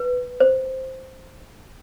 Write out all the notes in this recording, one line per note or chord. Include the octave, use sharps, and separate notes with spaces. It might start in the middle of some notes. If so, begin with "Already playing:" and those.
Already playing: B4
C5